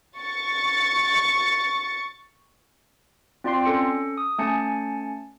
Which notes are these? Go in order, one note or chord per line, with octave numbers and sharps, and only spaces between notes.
C#6 A6 C#7
C4 F4 D5 G5 C6 C7
C#4 A4 C#7
D#6
A3 C#4 G#5 A5 C#7